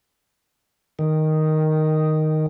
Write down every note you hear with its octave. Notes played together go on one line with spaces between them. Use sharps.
D#3